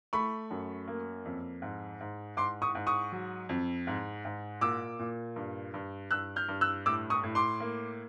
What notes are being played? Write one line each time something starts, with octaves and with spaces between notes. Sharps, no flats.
A3 B5 C#6
F#2
A#3
F2
G#2
G#2
G#2 C6 D6
C#6 D#6
G#2
C#6 D#6
F#3
F2
G#2
G#2
A#2 D6 E6
A#2
G2
G2
G2 E6 F#6
F6 G6
G2
E6 F#6
A2 D6 E6
C#6 D#6
A2
C6 D6
A#3